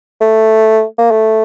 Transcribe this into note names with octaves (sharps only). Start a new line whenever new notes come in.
A3
A#3
A3